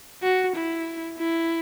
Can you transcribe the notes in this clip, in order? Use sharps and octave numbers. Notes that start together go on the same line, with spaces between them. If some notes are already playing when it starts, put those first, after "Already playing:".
F#4
E4
E4